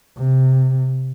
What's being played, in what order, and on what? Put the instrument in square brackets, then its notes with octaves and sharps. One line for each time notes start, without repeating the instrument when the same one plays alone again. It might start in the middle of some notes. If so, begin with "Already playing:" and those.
[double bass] C3